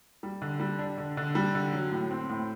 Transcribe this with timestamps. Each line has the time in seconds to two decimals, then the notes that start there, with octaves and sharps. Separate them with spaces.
0.23 G3
0.42 D3
0.60 G3
0.79 D4
0.98 D3
1.17 D3
1.35 G3
1.55 D3
1.73 F#3
1.91 A2
2.11 C4
2.29 A2